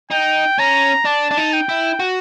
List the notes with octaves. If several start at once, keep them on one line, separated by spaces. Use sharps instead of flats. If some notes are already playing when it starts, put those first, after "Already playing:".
D#4 G5
C#4 A#5
D4 A5
D4
D#4
G5
E4
F#4